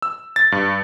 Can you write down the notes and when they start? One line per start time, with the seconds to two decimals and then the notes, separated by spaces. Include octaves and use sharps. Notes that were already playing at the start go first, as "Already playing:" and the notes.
0.02 E6
0.36 A6
0.52 G2